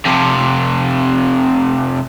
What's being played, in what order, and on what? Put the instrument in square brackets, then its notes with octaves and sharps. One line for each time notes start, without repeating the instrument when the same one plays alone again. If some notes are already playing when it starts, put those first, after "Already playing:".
[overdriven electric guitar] F2 C3